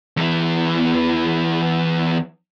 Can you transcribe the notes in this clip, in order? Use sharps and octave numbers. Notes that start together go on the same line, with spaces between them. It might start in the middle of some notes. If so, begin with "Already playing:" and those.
E2 E3